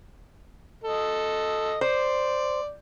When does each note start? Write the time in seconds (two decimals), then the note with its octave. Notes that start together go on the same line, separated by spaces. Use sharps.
0.84 A4 D#5
1.81 C5 D5